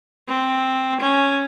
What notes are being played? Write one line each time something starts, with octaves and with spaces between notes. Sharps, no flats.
C4
C#4